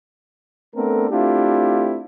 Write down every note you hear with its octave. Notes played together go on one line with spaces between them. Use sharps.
A3 B3 C4 D4 A4 A#4
A3 C4 D4 E4 F4 G4